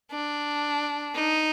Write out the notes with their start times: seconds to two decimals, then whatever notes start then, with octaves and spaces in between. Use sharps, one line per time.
0.12 D4
1.15 D#4